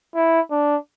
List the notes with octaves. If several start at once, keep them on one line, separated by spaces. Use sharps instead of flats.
E4
D4